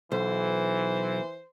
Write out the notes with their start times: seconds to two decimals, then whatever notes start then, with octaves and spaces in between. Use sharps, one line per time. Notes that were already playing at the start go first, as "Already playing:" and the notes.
0.12 B1 E3 C5